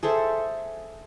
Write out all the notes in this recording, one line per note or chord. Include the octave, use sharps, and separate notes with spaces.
G#4 A4 C5 E5